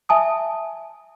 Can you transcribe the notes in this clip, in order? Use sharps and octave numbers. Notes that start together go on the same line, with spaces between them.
E5 G#5 A5 D#6